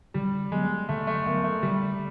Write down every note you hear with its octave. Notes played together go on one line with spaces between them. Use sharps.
D3 G3
F#3 G#3 B3
D3 A3
A3
F#3 A#3 B3
A3
D3 G3